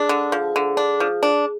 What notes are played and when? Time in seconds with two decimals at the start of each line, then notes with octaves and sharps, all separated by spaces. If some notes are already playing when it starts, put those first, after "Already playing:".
Already playing: G#3 D4
0.09 D3
0.32 F3
0.56 D3
0.77 D4
1.00 F3
1.23 D4